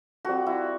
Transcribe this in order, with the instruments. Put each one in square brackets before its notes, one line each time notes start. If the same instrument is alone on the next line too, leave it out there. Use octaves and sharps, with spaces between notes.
[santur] G3 C4 F4 A4 [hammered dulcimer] F#4
[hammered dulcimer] E4